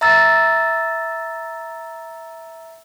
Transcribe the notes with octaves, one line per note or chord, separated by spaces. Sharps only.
E5 A#5 E6 A6